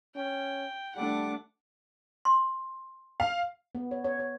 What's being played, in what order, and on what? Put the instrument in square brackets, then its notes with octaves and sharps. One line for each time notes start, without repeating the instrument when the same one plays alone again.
[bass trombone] C#4 [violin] G5
[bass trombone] G3 [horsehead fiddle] A3 D4 [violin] F#5 D6
[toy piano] C6
[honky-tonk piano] F5
[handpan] B3
C#5
C#5
C#5